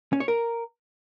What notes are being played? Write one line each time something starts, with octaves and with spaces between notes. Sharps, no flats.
C#4
C#5
A#4